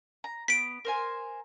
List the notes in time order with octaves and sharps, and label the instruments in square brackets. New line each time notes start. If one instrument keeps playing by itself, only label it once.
[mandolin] A#5
[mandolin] B3 [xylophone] B6 D7
[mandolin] A#4 C5 G#5